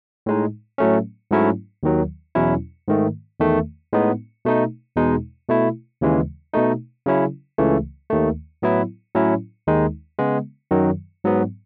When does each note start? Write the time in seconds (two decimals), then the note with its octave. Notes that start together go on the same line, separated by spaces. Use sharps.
0.26 A2 G#3 D#4
0.78 A2 F#3 A3 C#4
1.31 G#2 F#3 A3 C#4 E4
1.83 D#2 D#3 F#3
2.35 E2 B2 F#3 C#4 E4
2.88 G#2 D#3 A3
3.40 E2 D#3 A3
3.93 A2 G#3 B3 D#4
4.45 B2 A3 D#4
4.96 E2 B2 G#3 D#4
5.49 B2 A3 E4
6.01 D#2 C#3 E3 G#3
6.53 B2 A3 D#4
7.06 C#3 F#3 C#4 E4
7.58 C#2 C#3 E3 A3
8.10 D#2 D#3 A3
8.62 A2 F#3 B3 E4
9.15 A2 F#3 C#4 E4
9.67 D#2 D#3 G#3 D#4
10.19 C#3 G#3 B3
10.71 F#2 D#3 F#3
11.24 G#2 F#3 B3